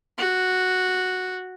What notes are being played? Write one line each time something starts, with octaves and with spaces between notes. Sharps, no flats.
F#4